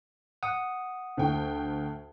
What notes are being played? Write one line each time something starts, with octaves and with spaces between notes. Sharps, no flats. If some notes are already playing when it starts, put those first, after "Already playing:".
F#5 D#6
D2 G5